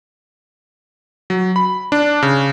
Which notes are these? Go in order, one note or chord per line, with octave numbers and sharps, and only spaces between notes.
F#3
B5
D4
C#3